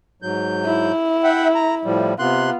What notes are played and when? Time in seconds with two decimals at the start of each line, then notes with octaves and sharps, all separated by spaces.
0.22 G#2 F#3 G6
0.65 E4
1.24 E5 F#5 G5
1.55 A#5
1.85 A2 F3 G3
2.19 C3 B3 F4 C6 F#6